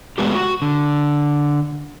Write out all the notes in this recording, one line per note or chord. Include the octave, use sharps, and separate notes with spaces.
G#3 A3 B3 F4 G4
F#4
D3